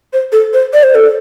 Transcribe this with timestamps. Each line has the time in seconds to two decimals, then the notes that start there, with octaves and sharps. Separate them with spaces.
0.13 C5
0.32 A4
0.53 C5
0.74 D5
0.83 C5
0.95 A4